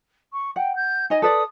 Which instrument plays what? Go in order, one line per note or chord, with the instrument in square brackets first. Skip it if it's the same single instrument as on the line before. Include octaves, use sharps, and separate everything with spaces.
[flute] C#6
[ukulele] F#5 [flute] G5
[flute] G6
[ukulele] D#4 D#5 [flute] G#5
[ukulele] A4 B4 D5 [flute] D#6